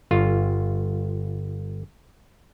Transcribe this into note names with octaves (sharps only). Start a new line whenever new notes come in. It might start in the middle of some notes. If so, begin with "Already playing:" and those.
G1 F4